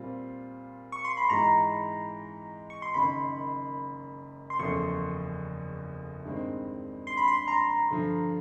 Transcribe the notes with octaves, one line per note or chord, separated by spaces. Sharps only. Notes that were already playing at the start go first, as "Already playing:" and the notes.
Already playing: A#2 G3 C4 F4
C#6
C6
B5
G#2 E3 G#3 A#5
C#6
C6
F#1 F#2 D#3 B5
C6
F#1 E2 C#3 F3 A3 C#6
G2 D#3 G#3 C4
C6
B5
C6
A#5
G2 D3 F3